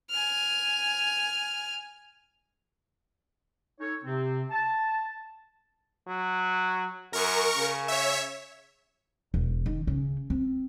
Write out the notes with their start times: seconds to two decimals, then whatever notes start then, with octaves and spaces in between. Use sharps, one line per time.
0.10 G#5 F6
3.80 D#4 A4 C#5
4.04 C3 C4
4.50 A5
6.07 F#3
7.13 F#2 A#4 C#6
7.57 C#3
7.88 C#5 E5
9.34 E1
9.66 D#3
9.87 C#3
10.30 C4